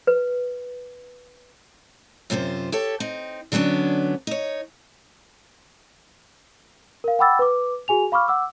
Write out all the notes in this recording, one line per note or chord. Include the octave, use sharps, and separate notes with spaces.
B4
F#2 C3 F4 A4 C5
G4 A4 C#5
C4 D#4
D3 F#3 B3 C#4 D4
D#4 C#5
A#4 F5
F#5 G5 B5 D6 E6 A6
B4 D6
F#4 G#4 G#5 F7
F5 B5 C#6 D6 F6
F#5 D6 E6